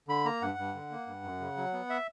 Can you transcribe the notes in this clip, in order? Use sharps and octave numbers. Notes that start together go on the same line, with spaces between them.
D3 B5
A#3 A#5
G2 F#5
G2
D3
A#3
G2
F#2
C#3
F#3
B3
E5